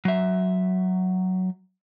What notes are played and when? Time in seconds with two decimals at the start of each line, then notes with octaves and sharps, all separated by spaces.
0.05 F#3 E5